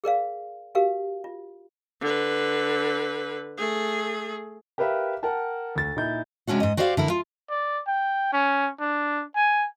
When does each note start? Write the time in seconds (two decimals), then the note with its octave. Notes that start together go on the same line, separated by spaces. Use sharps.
0.04 G#4 A#4 D5 F5
0.75 F#4 G4 A#4 F5
1.24 F4
2.01 D3 B4
3.57 A3 G#4
4.78 G4 A#4 B4 E5 F5
5.23 A#4 F#5 G5 A5
5.76 D2 A6
5.96 A#2 D#4 E4 G6
6.47 C3 G#3 C#4 D4 F#4
6.60 G#2 D#5
6.77 F#4 G4 C5 D5 D#5 F5
6.97 D3 E4 A#4
7.10 F4
7.50 D5
7.88 G5
8.33 C#4
8.80 D4
9.35 G#5